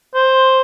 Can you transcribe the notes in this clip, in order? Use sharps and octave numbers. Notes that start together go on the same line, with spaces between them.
C5